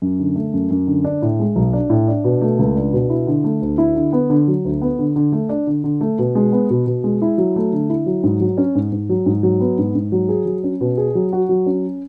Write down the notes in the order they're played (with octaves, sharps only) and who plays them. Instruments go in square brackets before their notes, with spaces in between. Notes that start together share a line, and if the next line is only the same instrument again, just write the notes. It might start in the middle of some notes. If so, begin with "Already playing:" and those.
[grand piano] F#2
D3
A3
F#2
F#2
D3
D4
A2
G#3
B1
D4
A2
D4
B2
A3
C#2
D4
B2
E4
D3
A3
D2
E4
D3
B3
D3
F#3
D2
B3
D3
D3
A3
D4
D3
D3
A3
B2
G#3
B3
B2
B2
G#3
E4
F#3
A3
D3
E4
F#3
G#2
F#3
C#4
G#2
G#2
F#3
G#2
F#3
B3
G#2
G#2
F#3
G#4
F#3
C#4
B2
G#4
F#3
F#4
F#3
C#4